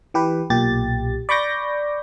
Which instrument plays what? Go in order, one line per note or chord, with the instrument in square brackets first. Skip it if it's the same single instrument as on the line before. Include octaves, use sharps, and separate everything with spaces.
[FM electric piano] E3 G4 B4
B1 A#2 G4 A6
D5 B5 C#6 D6 G6 A#6